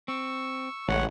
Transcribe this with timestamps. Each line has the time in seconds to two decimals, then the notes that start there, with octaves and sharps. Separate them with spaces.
0.08 C4 C#6 E6
0.88 A1 C#3 G#3 A3 C#5 F#5